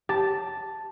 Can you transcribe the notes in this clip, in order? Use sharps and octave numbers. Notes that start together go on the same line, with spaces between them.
G4 A5